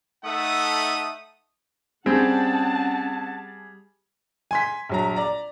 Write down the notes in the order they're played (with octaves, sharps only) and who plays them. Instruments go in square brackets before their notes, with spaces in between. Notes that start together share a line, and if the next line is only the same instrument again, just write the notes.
[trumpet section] A3 D#4 A4 E5 F#5 D#6
[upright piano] G3 G#4 [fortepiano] C4 [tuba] C#4 [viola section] F#5 A5
[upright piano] G#5 C6 B6
A#1 F#3 A#5
D5 A#5